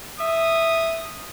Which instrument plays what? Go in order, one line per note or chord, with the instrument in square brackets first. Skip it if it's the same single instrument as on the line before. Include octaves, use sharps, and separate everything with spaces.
[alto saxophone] E5 [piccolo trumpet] D#6